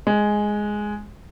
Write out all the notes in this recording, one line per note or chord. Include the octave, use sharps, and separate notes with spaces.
G#3